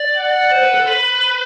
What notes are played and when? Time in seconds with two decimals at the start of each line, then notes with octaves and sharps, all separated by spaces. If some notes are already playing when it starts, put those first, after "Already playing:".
Already playing: D5
0.16 F#5
0.51 C5
0.63 B4
0.74 A4
0.86 B4